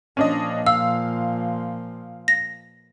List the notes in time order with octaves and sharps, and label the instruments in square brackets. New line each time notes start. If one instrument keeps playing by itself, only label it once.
[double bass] A#2 F3 [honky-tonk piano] C#4 D4 D#5
[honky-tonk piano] F5 [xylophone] E6
[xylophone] A#6